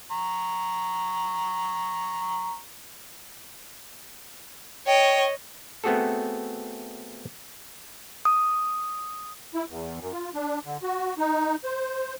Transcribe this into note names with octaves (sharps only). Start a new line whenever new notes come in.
A#5 C#6
C#5 D#5 G5
A3 B3 C4 F#4 G#4 A4
D#6
E4
E2
F#2
F4
D4
D3
F#4
D#4
C5